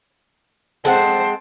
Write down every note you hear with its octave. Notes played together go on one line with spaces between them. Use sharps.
G#3 C4 C5 F#5 A5